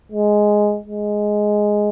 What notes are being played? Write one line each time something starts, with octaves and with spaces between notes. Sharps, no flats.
G#3
G#3